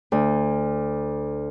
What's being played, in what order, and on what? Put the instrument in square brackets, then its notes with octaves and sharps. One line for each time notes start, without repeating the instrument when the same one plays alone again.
[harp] D2